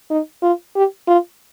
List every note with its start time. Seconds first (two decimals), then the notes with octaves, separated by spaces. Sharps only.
0.11 D#4
0.43 F4
0.76 G4
1.08 F4